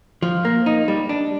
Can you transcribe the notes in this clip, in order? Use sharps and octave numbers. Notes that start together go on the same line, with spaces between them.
F3
A#3
D#4
G3
D4